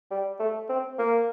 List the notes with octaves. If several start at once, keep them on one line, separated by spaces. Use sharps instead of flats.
G3
A3
C4
A#3